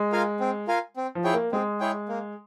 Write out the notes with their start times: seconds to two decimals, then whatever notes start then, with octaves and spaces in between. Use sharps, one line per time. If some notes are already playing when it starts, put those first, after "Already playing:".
Already playing: G#3
0.12 F4 A#4 F5 G#5
0.40 C4
0.68 F4 A#4 F5 G#5
0.97 C4
1.15 F3
1.24 E4 G#4 C#5 G5
1.34 A#3
1.52 G#3 C4
1.80 E4 G#4 C#5 G5
2.09 A#3